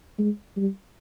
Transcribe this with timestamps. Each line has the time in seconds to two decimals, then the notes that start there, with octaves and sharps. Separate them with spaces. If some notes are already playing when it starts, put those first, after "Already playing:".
0.19 G#3
0.57 G3